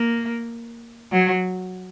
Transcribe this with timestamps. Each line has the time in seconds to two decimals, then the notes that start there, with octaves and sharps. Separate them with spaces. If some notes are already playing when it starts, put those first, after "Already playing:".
Already playing: A#3
1.12 F#3